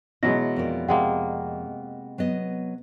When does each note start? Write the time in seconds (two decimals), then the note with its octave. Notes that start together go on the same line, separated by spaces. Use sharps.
0.23 B2 E3 F#3 G#3 A#6
0.56 F2 A#4 D5
0.89 C3 G#3 A#3 F#5 G5
2.18 F#3 B3 D#5